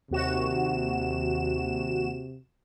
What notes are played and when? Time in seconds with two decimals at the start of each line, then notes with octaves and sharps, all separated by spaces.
0.11 D#2 C3 F#4 E7